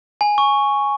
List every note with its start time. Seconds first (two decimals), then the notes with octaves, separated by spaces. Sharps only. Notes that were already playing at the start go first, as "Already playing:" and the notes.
0.21 G#5
0.38 C#6